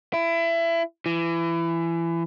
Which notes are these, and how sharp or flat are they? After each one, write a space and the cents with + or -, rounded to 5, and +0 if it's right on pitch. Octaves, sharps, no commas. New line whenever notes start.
E4 +25
E3 +25